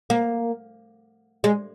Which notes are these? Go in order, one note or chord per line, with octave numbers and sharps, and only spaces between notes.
A#3
G#3